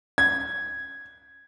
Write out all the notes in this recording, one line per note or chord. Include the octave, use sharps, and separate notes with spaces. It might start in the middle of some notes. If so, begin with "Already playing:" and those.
G#6